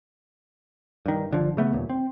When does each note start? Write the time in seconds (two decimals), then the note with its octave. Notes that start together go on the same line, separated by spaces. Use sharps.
1.06 G2 D#3
1.31 G1 D3 F3
1.57 C#3 A3 B3
1.72 D#1 D#2 A#2
1.90 C4